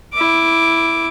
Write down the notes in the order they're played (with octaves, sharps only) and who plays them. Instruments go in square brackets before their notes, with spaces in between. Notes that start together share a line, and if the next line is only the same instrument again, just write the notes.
[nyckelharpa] E4 D6